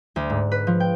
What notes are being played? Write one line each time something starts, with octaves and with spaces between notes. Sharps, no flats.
D2
G#2
B4
F3
G5